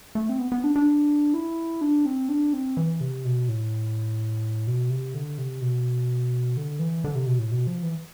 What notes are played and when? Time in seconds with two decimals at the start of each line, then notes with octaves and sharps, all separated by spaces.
0.15 A3
0.29 C4
0.39 B3
0.52 B3
0.64 D4
0.76 D4
1.34 E4
1.81 D4
2.06 C4
2.29 D4
2.53 C4
2.77 E3
3.01 C3
3.25 B2
3.49 A2
4.67 B2
4.90 C3
5.14 D3
5.38 C3
5.61 B2
6.57 D3
6.79 E3
7.04 D3
7.15 C3
7.27 B2
7.39 A2
7.52 B2
7.67 F3
7.83 E3